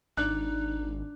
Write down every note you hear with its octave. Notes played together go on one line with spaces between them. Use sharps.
G#1 D4 D#4 F#6